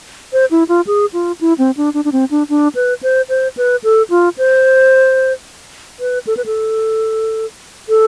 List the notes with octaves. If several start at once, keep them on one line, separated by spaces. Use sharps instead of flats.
C5
E4
F4
G#4
F4
E4
C4
D4
D4
D4
C4
D4
D4
B4
C5
C5
B4
A4
F4
C5
B4
A4
B4
A4
A4